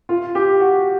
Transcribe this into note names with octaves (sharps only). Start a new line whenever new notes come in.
F4
G4
F#4